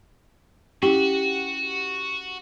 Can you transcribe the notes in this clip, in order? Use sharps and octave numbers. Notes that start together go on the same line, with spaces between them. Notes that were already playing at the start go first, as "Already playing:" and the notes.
C#4 E4 F#4 G4